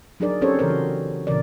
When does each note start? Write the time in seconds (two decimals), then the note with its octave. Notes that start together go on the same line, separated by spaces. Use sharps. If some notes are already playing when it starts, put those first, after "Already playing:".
0.20 F#3 D4 D#4 G#4 A#4 D5
0.41 C4 C#4 G4 A4 C5 C#5
0.59 C#3 E3 C#4 A#4 C5
0.70 F#4
1.27 A#2 C#3 E3 A#4 D5